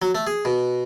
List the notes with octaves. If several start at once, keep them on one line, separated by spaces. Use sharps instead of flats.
F#3
A3
G#4
B2